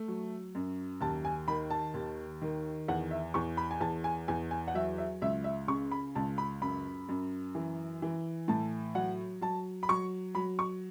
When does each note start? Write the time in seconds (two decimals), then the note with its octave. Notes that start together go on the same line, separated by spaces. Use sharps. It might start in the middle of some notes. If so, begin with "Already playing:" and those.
Already playing: A3
0.08 F#3
0.55 F#2
1.01 D#2 A5
1.25 G#5
1.48 D#3 B5
1.70 A5
1.94 D#2
2.42 D#3
2.88 E2 F#5
3.11 E5
3.34 E2 C#6
3.57 B5
3.71 G#5
3.81 E2 A5
4.04 G#5
4.28 E2 G#5
4.51 G#5
4.68 F#5
4.74 F#3 E5
4.98 E5
5.22 C#2 E5
5.44 E5
5.68 C#3 C#6
5.91 B5
6.15 C#2 A5
6.38 B5
6.61 F#2 B5
7.09 F#2
7.55 E3
8.02 E3
8.48 A2 A5
8.95 F#3 F#5
9.41 F#3 A5
9.83 B5
9.89 F#3 C#6
10.35 F#3 B5
10.59 C#6